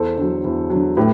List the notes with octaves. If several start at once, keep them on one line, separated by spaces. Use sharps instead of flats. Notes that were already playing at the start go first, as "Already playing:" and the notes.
Already playing: E2 A4 C5
D3 F#3
E2
F#3
D3
A2 G4 B4